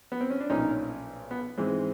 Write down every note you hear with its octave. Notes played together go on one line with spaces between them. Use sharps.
B3
C4
C#4
D4
B1 A#2 F3 C#4 D#4
B3
G#2 E3 G#3 C4